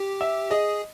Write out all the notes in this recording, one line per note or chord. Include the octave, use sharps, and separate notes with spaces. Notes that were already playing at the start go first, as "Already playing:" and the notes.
Already playing: G4
E5
G#4 D#5